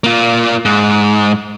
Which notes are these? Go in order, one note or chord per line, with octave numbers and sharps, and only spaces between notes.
A#3 F4
G#2